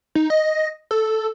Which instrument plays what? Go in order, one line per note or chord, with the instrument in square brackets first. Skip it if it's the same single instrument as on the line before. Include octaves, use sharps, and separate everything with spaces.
[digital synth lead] D#4
D#5
A4